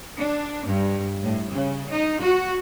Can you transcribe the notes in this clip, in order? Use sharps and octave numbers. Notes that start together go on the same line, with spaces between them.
D4
G2
A2
C#3
D#4
F#4